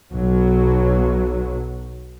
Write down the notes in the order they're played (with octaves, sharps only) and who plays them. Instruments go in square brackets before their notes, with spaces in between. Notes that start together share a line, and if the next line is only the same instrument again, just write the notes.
[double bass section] B1 F#3